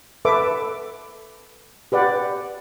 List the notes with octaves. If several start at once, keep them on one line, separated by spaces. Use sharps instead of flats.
A4 B4 E5 D6
G4 B4 D5 F#5